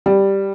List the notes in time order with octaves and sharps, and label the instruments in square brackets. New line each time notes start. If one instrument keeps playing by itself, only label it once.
[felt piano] G3